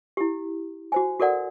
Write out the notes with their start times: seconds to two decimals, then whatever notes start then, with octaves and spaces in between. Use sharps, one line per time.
0.17 E4 G4
0.92 F#4 C5 G#5
1.20 F#4 A4 A#4 D5 F#5